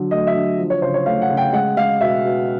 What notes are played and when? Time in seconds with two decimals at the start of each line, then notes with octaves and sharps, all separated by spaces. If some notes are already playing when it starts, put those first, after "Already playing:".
Already playing: D3 F#3
0.11 A3 D#5
0.27 E5
0.35 D3
0.58 F3
0.70 C#5
0.82 C#3 C5
0.94 C#5
1.06 A3 F5
1.22 F#5
1.29 C#3
1.37 G5
1.53 G#3 F#5
1.77 G#3 F5
2.00 B2 E5
2.25 B2